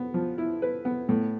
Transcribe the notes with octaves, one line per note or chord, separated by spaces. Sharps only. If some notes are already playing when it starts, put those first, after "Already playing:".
Already playing: B3
F3
E4
B4
B3
A2